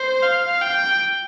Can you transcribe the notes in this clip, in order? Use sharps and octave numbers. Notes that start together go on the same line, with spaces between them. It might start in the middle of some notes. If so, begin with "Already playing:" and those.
Already playing: C5
F5
G5